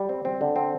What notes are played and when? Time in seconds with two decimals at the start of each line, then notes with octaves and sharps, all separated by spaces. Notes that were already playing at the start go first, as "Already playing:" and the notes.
Already playing: G3
0.09 C4
0.25 C4
0.41 D3
0.56 C4